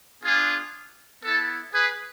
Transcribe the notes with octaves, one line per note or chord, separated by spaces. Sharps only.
B3 D4 F4 G#4
B3 E4 A4
G#4 B4